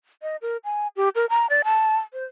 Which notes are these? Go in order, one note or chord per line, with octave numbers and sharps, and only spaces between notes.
D#5
A#4
G#5
G4
A#4
A#5
D5
A5
C5